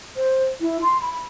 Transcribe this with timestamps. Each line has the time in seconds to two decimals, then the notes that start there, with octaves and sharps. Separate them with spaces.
0.16 C5
0.61 E4
0.82 C6
1.02 B5